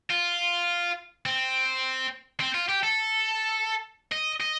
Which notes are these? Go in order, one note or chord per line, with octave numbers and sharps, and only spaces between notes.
F4
C4
C4
F4
G4
A4
D#5
D#5